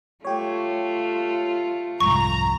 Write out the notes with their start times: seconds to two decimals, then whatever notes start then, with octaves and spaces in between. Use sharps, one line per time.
0.25 A3 F4 G4 C#5
2.00 C2 F2 G#2 A#5 C#6